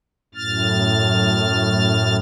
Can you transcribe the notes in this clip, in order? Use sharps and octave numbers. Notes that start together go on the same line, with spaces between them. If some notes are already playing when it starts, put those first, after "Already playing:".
F#2 A2 F6 A6